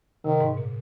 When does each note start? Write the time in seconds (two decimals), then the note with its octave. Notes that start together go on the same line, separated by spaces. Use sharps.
0.25 C3 D#3
0.41 G#2
0.57 A#2